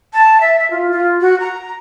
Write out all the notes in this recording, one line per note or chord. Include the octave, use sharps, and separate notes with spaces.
A5
E5
E5
F4
F4
F#4
A#5